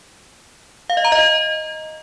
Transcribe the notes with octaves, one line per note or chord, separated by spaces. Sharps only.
F5
D#5
A#5
D#5